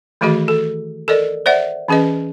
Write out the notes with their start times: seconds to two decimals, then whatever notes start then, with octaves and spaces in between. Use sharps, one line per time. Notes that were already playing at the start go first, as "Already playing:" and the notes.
0.21 D#3 E3 A3 F#4 G#4 D#5
0.48 A4
1.08 A4 A#4 D5 D#5
1.46 C5 D5 E5 F#5
1.88 E3 C#4 G#4 B4 D#5